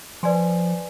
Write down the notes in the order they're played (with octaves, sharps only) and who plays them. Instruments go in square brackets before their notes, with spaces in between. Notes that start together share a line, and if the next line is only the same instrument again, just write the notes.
[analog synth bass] F3 [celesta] B4 D5 G#5 C6